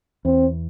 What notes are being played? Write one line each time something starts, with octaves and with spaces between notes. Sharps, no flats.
E2 C4